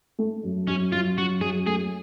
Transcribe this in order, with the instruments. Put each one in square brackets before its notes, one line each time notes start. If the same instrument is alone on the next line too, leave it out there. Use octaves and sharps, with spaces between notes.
[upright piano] A3
F#2
[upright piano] F#2 [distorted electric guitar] C#4
[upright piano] F#2 [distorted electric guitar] F4
[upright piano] F#2 [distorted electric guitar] F#4
[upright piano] F#2 [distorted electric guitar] G#4
[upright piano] A3 [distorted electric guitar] G#4